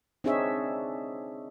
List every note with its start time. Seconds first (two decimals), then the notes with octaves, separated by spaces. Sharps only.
0.24 C4 D4 D#4 G#4 C#5 E5